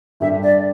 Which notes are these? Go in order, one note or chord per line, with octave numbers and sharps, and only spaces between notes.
G2 D3 G3 D4 E5
D5